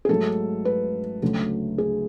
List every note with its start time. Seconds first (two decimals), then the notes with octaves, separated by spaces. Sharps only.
0.05 G#4
0.09 G#2 F#3 A3 A4
0.65 B4
1.22 D2 C#3 F#3 A3
1.78 G#4